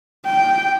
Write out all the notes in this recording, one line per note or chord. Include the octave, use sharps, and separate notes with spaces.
G5